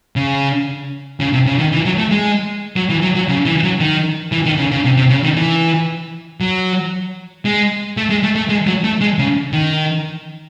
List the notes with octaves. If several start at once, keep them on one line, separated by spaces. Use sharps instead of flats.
C#3
C#3
C3
C#3
D#3
E3
F#3
A3
G#3
F#3
E3
F#3
F#3
C#3
E3
F#3
D#3
E3
D#3
C#3
C#3
C3
C3
C#3
D#3
E3
F#3
G#3
A3
G#3
A3
A3
G#3
F#3
A3
G#3
C#3
D#3